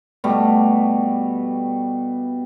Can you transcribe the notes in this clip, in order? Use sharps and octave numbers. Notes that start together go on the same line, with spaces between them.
B2 G3 A3